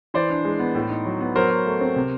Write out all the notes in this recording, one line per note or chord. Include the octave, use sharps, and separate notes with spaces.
E3 C5 D5
D4
G#3
B3
A2
D#4
F#3
B3
F#3 A#4 C5
F#3
A3
C4
C3